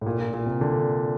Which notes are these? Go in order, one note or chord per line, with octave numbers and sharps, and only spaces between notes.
A2
A#2
A#2
A#2
C3
D3